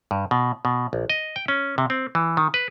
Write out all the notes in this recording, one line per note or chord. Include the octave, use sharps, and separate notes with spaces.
G2
B2
B2
A#1
D#5
G5
C#4
C3
C4
E3
D#3
B4